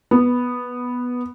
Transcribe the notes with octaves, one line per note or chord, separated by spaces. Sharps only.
B3